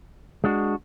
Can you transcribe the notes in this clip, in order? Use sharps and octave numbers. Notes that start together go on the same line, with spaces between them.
G#3 D4 F#4